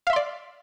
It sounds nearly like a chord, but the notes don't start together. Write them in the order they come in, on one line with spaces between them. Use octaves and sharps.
F5 E5 C6 D5